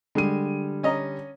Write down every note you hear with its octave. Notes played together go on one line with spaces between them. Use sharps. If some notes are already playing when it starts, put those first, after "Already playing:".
D3 G3 G#3 D#7
C#4 D#5 A#5